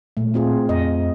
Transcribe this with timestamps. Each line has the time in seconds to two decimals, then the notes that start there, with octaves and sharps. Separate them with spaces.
0.17 A#2 A3
0.34 C4 F4 G#4
0.69 F2 D#5